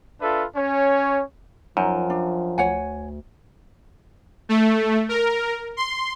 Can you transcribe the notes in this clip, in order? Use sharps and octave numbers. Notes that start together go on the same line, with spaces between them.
D4 F4 A4 B4 E5
C#4 C#5
F#2 F3 D#4
D4
D2 C#5 F#5 G#5
A3
A#4
C6